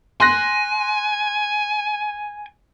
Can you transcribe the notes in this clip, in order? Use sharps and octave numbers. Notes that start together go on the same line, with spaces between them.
G#5 C6 F#6 A#6